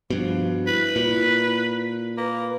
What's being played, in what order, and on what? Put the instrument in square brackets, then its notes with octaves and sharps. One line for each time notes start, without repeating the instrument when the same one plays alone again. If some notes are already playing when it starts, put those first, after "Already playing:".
[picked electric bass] G2 B2 [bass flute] F3
[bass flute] E4 [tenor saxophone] B4
[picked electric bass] A#2
[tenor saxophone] A#3 [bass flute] B4